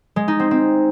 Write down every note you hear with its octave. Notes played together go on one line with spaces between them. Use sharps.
G#3
D#4
C4
C4